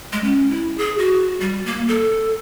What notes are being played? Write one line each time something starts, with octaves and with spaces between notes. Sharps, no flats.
G#3
C#4
E4
G#4
F#4
G3
A#3
A4